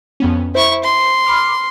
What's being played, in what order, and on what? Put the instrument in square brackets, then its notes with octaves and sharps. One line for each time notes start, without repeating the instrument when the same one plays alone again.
[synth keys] F2 B3 C#4
[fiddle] E4 C#6 [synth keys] C5
[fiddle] C6
[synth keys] B5 D6 F6